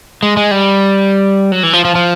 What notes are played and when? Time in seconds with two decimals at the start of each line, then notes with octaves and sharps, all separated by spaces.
0.23 G#3
0.37 G#3
0.51 G3
1.52 F#3
1.63 E3
1.73 F3
1.85 F3
1.95 F3